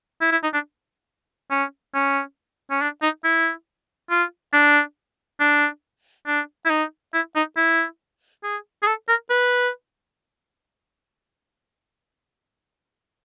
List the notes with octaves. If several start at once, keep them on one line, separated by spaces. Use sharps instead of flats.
E4
E4
D#4
D4
C#4
C#4
C#4
D4
D#4
E4
F4
D4
D4
D4
E4
D#4
E4
D#4
E4
G#4
G#4
A4
A#4
B4